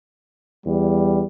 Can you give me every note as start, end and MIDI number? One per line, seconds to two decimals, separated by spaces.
0.66 1.22 40
0.66 1.27 55